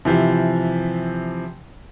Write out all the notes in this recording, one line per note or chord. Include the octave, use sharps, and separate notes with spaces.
C3 E3 F3